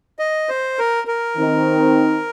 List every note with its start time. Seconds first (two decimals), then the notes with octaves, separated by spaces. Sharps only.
0.19 D#5
0.49 C5
0.79 A#4
1.08 A#4
1.37 D#3 C4 D#4